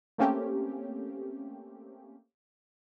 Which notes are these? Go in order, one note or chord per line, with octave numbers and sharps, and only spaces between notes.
A3 A#3 C4 C#4 G4